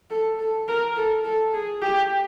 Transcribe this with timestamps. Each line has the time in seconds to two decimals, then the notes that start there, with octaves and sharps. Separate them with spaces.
0.10 A4
0.39 A4
0.68 A#4
0.97 A4
1.25 A4
1.54 G#4
1.82 G4